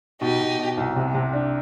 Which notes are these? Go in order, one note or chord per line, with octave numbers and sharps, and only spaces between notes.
B2 D#4 G4
B2
B2
C2
C3
C3
D4